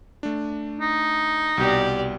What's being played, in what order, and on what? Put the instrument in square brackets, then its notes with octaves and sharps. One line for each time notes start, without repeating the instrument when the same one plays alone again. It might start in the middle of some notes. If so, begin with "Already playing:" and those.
[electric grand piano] A3 D4
[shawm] D#4
[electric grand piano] C2 B2 [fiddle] G4 D5